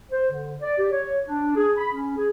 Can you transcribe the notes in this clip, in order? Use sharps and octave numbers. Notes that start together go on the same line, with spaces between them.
C5
D3
D5
G4
C#5
D4
G#4
B5
C#4
G#4